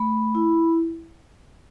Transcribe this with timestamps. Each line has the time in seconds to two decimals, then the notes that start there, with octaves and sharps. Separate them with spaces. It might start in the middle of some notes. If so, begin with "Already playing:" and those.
Already playing: A3 B5
0.35 E4